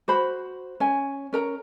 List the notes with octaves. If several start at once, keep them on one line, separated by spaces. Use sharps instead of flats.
F#4 C5 B5
C#4 G#5
C#4 A#4 A#5